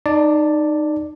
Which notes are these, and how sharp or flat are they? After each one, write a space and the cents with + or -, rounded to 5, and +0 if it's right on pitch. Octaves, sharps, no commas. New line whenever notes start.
D#4 -20 D5 +0 A5 +10